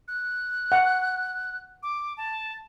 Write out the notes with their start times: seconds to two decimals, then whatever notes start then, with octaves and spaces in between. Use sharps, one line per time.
0.08 F#6
0.72 F#5
1.83 D6
2.17 A5